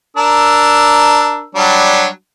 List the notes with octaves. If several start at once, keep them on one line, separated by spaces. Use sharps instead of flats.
D4 A#4 E6
F#3 G3 D4